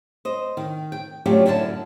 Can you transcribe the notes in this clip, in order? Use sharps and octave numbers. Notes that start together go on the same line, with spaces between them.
C5 D#5
D#3
G5
F#3 A3 C#4 D4 F4 G4
F#2 D3 E4 G5 A5